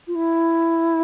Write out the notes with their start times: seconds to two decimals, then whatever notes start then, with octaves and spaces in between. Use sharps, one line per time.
0.07 F4
0.15 E4